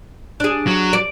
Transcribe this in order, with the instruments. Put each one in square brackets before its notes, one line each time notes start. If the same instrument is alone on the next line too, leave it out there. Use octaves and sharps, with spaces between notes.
[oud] D4 G#4
[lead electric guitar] F#3
[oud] D5